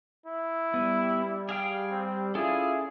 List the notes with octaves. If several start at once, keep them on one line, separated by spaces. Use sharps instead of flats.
E4
G3 B3
G#4 F5 G5
C4
C#4 E4 F4 G#4 A4 D5